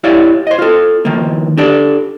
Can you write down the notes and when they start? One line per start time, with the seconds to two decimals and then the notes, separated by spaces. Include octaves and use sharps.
0.04 E4 G4 C#5 D5 F5
0.47 C5 D#5
0.59 F4 A4
1.05 D#3 F3 A#3
1.57 D4 G4 A4 D5